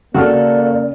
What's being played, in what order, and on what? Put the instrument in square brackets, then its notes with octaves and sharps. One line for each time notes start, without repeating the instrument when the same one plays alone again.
[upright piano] C#3 G5 F6 [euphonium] A#3 [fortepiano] F#4 A4 [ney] D5